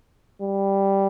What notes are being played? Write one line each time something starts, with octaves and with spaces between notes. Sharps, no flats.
G3